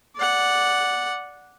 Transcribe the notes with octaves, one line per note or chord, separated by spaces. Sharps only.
D5 F#5